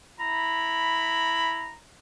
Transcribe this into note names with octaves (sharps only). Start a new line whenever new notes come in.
E4 A#5 B5